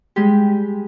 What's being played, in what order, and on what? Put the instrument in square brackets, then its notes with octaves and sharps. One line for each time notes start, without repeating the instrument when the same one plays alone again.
[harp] G3 G#3 G4